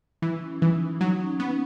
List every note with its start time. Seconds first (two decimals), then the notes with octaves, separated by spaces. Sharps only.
0.22 E3 E4
0.42 C#4
0.62 E3 D#4
1.00 F#3 D#4
1.20 C#4
1.39 B3 C#4